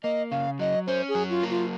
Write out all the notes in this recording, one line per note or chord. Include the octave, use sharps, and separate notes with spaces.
A#3 D#5
C#3 F5
F#3 D#5
C#4 C5
G#4
F#3
F4
A#3
F4